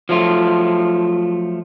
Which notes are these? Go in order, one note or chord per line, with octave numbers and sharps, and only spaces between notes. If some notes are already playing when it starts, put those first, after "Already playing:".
F3 F#3 A3 F4